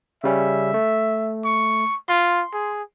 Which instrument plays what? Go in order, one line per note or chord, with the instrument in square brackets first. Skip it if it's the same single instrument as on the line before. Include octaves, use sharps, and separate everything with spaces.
[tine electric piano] C#3 G3 C#4 [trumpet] E5
[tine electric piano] A3
[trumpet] C#6
[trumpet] F4 [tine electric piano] C6
[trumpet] G#4